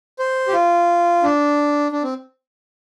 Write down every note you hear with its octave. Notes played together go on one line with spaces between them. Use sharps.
C5
G4
F4
D4
D4
C4